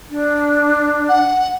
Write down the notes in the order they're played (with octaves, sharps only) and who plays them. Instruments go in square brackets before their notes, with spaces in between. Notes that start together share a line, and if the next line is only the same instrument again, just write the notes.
[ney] D4
[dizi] F#5